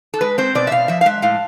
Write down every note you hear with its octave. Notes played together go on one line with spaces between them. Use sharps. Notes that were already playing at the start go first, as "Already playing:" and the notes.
A4
G#3 B4
C4 C5
B2 D5
E5
B2 F5
F3 E5
F5
G#3 E5
A2 F5